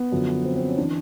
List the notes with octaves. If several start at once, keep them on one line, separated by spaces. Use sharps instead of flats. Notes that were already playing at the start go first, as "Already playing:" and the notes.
Already playing: B3
F#2 D3 F3
C4
C4
C#4
E3 D4